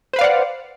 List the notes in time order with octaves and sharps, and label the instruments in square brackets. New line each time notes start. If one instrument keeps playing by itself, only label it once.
[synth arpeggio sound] C5
B4
F5
D5
F#5